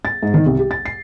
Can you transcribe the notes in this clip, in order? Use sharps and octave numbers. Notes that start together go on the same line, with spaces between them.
A6
G#2
D#3
C2
G4
A6
C7